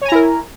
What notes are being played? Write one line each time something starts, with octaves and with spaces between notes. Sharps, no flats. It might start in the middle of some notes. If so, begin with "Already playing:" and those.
E4 A#4 C#5 G#5 A#5